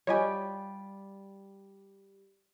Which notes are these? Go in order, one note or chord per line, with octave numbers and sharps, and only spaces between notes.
G3 F4 G4 C#5 D#5 G#5